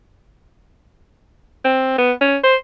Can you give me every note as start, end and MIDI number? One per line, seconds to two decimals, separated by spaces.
1.65 1.97 60
1.98 2.12 59
2.21 2.37 61
2.44 2.56 72